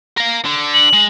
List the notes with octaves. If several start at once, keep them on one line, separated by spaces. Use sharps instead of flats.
A#4 F5
D3
F#7
G#3